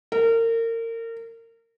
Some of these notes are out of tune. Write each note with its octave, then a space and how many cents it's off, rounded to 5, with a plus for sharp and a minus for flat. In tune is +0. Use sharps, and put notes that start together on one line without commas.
A#4 -30